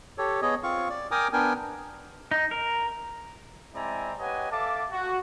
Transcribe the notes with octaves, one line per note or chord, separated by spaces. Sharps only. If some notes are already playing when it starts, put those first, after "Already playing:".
G4 A4 C#5
B3 G#4 C#5 D#5
C4 F4 F5 C#6
D5
A#4 G5 G#5 A#5 D6 D#6
B3 D4 A#4 G5 G#5
D#4
A#4
G#3 C4 E4 D5 G#5 A#5
G4 B4 C#5 D#5 F#5 G#5
A4 E5 F5 A5 D6
F#4